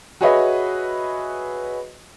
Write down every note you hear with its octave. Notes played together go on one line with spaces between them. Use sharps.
F#4 G#4 B4 C#5 D#5 E5